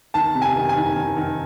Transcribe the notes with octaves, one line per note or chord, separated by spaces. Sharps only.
D#3 A5
C3
G#5
D#3
G#5
D#3
D#3
D#3